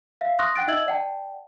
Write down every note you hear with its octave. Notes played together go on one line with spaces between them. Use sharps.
E5 F5
C6 C#6 D#6 F6 F#6 A#6
F#5 G5 F#6 A6 D7
D#4 D#5 E5 E6 G#6 F#7
D5 F#5 G5 A5